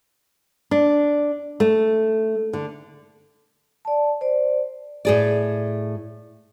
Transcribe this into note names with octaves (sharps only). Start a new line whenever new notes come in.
D4
A3
D3
D5 A5
C5 D5
A2 G#4 D5